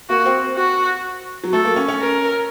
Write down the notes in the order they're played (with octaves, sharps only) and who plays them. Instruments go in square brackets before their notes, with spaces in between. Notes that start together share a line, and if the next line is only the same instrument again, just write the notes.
[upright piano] A#3 [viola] F#4
[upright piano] C4
[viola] F#4
[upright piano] F#3
[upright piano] A3 [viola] A4
[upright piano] A#3
C#4
C#4
[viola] A#4